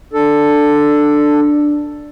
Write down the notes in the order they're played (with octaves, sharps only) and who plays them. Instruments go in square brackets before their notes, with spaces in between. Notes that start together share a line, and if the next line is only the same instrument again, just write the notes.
[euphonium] D4 [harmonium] A4